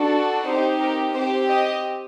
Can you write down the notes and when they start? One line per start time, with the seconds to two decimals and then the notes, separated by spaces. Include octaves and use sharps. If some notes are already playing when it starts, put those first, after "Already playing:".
Already playing: D4 F#4 A4
0.46 C4 D#4 G4 C5
0.80 A#4
1.15 C4 G4 C5
1.47 D#5